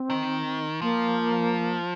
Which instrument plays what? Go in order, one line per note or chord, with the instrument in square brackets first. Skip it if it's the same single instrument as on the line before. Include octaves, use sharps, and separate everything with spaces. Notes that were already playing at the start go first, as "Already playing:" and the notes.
Already playing: [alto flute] C4
[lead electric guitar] D#3
[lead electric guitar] F3 [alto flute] A#3